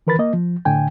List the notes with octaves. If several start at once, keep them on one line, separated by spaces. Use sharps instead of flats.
D#3 E3 A#4 B4 B5 A6
A#3 D#5
F3
A2 D3 G5 G#5